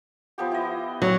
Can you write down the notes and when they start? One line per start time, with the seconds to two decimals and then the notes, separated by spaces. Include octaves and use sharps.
0.38 F3 B3 G4
0.52 E4 D#5
1.02 F#3 D5